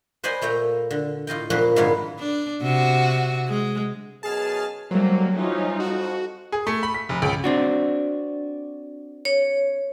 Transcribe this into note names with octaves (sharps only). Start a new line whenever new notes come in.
B4 C5 D5 D#5 F#5 G#5
A#2 A3 G5 A#5
D3
A2 F4 D#5 G5
F2 A#2 F3 F#4 B4 C6
G#2 D3 D#3 B3 E4 F4
D4
C3 F#4
G#3
F#2 B2 G#4 A5 F6
F#2 D3 F#3 G3 A3 A#3 C5
E3 C#4 D#4 F4
F2 F#4
G#4
A3
B5
B6
F1
C#2
C4 D4 F#4
C#5